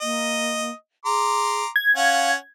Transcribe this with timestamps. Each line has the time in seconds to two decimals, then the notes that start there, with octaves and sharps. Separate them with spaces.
0.01 A#3 D#5
1.05 G#4 A#5 C6 D6
1.76 G#6
1.96 C#4 F5 F#5